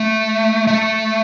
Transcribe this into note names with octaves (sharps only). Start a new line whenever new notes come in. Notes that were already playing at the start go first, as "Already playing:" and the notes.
Already playing: A3
A3